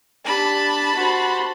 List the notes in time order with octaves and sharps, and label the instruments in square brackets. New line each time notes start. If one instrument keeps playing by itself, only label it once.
[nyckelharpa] D4 G4 [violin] A5 B5
[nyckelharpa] F#4 C5